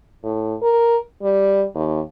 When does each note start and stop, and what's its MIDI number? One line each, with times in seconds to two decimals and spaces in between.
0.23 0.55 45
0.62 0.99 70
1.22 1.65 55
1.75 2.01 39